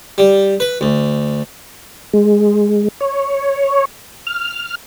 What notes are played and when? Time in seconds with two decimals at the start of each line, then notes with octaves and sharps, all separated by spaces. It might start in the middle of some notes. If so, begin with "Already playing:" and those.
0.18 G3
0.60 B4
0.81 D2
2.13 G#3
3.00 C#5
4.27 F6